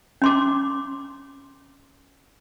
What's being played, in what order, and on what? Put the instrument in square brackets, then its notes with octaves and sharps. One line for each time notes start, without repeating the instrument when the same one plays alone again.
[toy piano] C#4 C6 D6